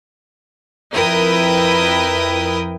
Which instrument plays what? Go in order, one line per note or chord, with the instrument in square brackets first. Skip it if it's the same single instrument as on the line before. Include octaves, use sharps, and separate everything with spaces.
[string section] F2 E4 A#4 B4 G5 D#6